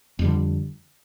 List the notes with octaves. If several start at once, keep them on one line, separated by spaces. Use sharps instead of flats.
F2 D3 G3